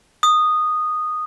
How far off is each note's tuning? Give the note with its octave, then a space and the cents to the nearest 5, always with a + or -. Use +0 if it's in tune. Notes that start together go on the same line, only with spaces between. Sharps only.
D#6 -10